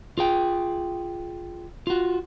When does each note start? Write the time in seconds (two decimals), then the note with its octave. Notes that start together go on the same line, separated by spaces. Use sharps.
0.18 F4 G#4 G5
1.87 F4 F#4